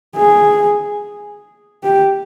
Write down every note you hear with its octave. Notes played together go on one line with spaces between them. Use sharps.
G#4
G4